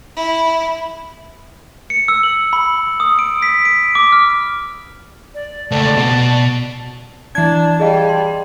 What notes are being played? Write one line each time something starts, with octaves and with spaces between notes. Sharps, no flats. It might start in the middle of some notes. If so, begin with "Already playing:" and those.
E4
C#7
E6
F#7
B5
D#6
D7
B6
D7
D6
F6
D5
C#2 A3 D5 A5
B2
E3 D4 A5 G#6
G3 G#4 D#5 F5
C6